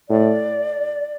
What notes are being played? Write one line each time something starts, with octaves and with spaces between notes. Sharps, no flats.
A2 D5